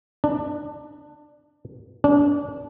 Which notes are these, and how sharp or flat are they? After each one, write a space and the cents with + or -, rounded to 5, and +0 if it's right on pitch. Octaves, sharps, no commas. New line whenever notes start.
D4 +15
D4 -30